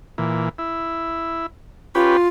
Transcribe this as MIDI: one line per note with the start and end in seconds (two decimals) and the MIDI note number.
0.18 0.49 46
0.18 0.49 52
0.58 1.46 64
1.95 2.17 61
1.95 2.28 65
1.95 2.17 67
1.95 2.17 71